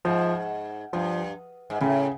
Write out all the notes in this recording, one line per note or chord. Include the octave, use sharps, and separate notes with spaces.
G#2 F3
G2 F3
G#2
A2 C#3